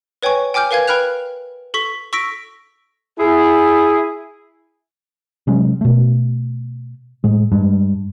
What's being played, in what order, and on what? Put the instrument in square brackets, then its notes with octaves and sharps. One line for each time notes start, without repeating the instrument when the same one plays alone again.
[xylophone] B4 C#5 G5 G#5 C#6
G5 G#5 D6 F6 G6
A#4 B4 F5 G#5 G#6
B4 G5 B5 F6 F#6 F7
A4 C#6 B6
C#6 E6 A#6 B6 D7
[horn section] E4 G#4
[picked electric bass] C3 F#3 G#3 C#4
B2 A3
A2 G#3
G2 G#3